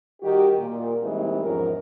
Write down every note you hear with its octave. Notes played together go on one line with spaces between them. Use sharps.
D#3 G3 F#4 G4
A#2 A#3
E3 G3 G#3 A#3 C4 D#4
E2 G#2 F3 C#4 A#4